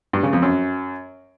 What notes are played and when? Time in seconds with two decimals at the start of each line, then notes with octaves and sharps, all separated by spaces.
0.13 G2
0.23 C#3
0.33 F2
0.42 F#2